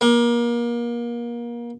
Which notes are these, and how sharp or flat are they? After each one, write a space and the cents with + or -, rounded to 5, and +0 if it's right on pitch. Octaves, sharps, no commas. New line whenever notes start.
A#3 +30